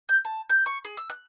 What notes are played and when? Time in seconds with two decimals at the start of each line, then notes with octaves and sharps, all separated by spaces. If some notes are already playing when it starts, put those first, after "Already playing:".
0.09 G6
0.25 A5
0.50 G6
0.66 C#6
0.85 G#4
0.97 E6
1.10 F#6